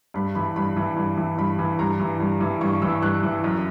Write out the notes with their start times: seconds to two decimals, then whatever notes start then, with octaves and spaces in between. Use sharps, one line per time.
0.14 G2 B5
0.35 E3 B5
0.56 G2 B5
0.77 E3
0.96 G2
1.17 E3
1.38 G2 B5
1.59 E3
1.79 G2 A#5
2.00 E3
2.20 G2
2.41 E3
2.61 G2 C#6
2.82 E3 E6
3.02 G2 F#6
3.23 E3
3.44 F#2